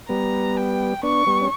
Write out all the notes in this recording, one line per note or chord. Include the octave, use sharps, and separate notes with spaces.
G3 B3 A#5
G5
B3 D4 C#6
G3 B3
C#4